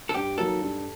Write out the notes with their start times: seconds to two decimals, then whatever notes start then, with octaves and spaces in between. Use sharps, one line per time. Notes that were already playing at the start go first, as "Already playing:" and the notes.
0.09 A4
0.14 G2 G4
0.38 D#3 F#3 A#3 D#4 A4
0.61 G2